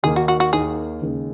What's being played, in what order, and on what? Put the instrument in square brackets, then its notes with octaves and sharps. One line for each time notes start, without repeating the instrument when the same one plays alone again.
[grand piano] D#2 D#3 A#3 [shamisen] G#4
[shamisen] F#4
F#4
F#4
[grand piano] D#2 D#3 A#3 [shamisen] G#4
[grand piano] D#2 C#3 G#3